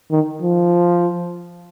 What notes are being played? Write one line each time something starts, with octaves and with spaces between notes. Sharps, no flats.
D#3
F3